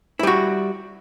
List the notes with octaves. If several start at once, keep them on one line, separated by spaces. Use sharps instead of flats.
G3 E4 F#4